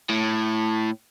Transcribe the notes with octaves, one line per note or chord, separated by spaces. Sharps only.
A2